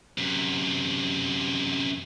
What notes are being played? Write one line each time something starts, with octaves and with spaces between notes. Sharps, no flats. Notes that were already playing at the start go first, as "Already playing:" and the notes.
F#2 C3